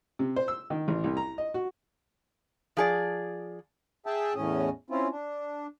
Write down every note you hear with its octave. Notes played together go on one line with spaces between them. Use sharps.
C3
C5
E6
D#3
A1
C2
A#5
D#5
F#4
F3 G#4 D5
G#4 E5 G5 A5
E2 A2 C#4 D#5
C4 C#4 E4 F4
D4